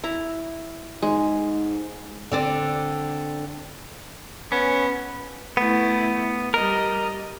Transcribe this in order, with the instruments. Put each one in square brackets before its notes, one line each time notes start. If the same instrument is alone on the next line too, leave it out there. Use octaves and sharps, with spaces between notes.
[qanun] E4 A#5
[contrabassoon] G#2 [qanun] G#3
[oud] D3 C4 D5
[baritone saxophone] B3 [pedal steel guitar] C#4
[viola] A3 E4 [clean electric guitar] B3
[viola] G3 D#5 [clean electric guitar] A#4